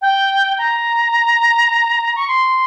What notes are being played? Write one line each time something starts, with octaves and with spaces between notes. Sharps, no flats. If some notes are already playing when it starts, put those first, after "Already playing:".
G5
A#5
C#6
C6